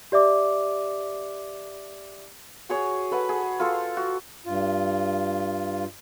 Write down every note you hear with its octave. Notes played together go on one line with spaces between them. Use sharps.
G4 D5 E5 D6
F#4 G#4 C#5
A4 B4 F#5
G#4
F4 A4 C5
F#4
G2 F4